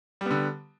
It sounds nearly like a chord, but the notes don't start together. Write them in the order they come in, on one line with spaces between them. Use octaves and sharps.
G3 B3 D3